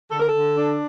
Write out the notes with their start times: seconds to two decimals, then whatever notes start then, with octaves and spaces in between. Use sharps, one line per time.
0.11 D3 A4
0.20 A#4
0.27 A4
0.35 D3
0.57 D4